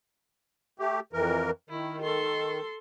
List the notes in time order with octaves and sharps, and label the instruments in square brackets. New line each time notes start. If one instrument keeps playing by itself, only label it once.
[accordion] A3 G4
F2 E3 A#4
[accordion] D#3 [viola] E4
[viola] A4 C6